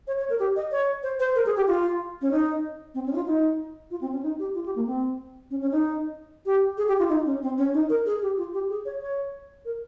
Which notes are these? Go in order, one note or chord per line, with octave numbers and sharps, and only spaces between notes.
C#5
C#5
A#4
G4
D#5
C#5
C5
C5
A#4
G#4
G4
F4
C#4
D#4
C4
C#4
D#4
F4
D#4
F4
C4
C#4
D#4
G4
F4
G4
A#3
C4
C#4
C#4
D#4
G4
G#4
G4
F4
D#4
C#4
C4
C#4
D#4
A#4
G#4
G4
F4
G4
G#4
C#5
C#5
A#4